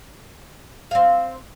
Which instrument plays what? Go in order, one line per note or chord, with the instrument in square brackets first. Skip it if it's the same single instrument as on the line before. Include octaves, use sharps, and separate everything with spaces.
[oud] C4 F5